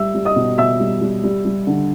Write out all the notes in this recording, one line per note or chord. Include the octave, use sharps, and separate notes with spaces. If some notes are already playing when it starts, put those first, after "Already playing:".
Already playing: G3 E5 E6
G3
D#5 D#6
B2
B2 E5 E6
G3
G3
G3
G3
D3